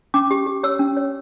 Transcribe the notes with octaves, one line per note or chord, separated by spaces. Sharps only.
C#4 D6
G4
G4
C#5 E6
C#4
C#5